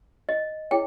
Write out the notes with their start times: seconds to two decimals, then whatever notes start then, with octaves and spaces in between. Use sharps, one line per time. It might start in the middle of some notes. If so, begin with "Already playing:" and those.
0.29 D#5
0.71 E4 G#4 C#5 G5